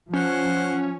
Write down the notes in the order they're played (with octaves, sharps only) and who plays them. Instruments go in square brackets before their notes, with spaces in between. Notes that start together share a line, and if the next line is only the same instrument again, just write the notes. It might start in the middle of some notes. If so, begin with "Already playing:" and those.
[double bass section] F3 [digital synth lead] C#4 [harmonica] C5 F#5